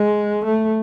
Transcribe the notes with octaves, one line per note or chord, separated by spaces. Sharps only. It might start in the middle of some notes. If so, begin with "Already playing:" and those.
Already playing: G#3
A3